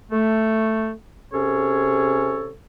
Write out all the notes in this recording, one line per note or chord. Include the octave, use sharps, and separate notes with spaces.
A3
C3 C#4 G#4 A4 C#5